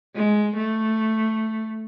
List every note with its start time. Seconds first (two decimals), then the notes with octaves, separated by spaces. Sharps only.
0.16 G#3
0.56 A3